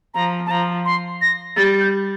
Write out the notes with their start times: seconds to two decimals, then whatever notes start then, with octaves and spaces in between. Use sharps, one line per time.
0.14 F3 A#5
0.46 A5
0.50 F3 A#5
0.85 C6
1.22 A#6
1.56 G3 A6
1.81 G6